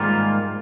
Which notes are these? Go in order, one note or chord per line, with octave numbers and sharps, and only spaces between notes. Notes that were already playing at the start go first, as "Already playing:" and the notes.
Already playing: G#2 D#3 G3 A#3 F4